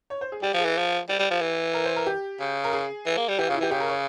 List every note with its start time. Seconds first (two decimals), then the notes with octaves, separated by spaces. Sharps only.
0.10 C#5
0.21 C5
0.32 G#4
0.42 G3 G4
0.54 F3
0.59 G#4
0.65 E3
0.78 F3
1.09 G3 G4
1.19 G3
1.31 F3
1.41 E3
1.74 A#4
1.84 C5
1.96 A#4
2.06 G4
2.39 C#3
2.64 A#4
2.73 G#4
3.06 E3
3.17 A#3
3.28 G3
3.39 E3 G4
3.47 F4
3.50 C#3
3.55 E4
3.60 E3 G4
3.71 C#3 G4
3.80 A#4
3.88 C#5